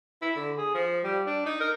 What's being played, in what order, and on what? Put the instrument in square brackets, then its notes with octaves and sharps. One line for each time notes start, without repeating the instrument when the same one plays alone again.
[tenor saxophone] E4
D3
G#4
F3
G3
D4
D#4
A#4